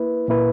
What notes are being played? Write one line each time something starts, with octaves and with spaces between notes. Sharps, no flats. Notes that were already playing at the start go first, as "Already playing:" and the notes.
Already playing: A#3 E4 B4
A#2 A#3 E4 B4